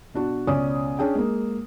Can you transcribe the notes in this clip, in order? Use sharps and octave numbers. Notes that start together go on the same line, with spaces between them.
B2 D4 F#4
C#2 B2 C#4 D5 G#5 D#6
C#4 D4 G#4 G5
G#3 A#3